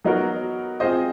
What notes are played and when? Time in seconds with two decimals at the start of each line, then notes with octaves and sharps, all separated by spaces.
0.05 F#3 B3 D#4 F#4 A#4
0.80 C4 F4 G#4 C5 D#5